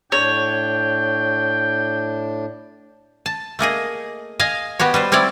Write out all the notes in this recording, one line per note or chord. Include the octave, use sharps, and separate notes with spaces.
A2 D4 C#5 G5
A5
A3 A#3 G#4 D#5
D#5 F5 G#5
B3 F#4 G4 C#5
G3 B4 C5
G3 C4 E4 C#5 D5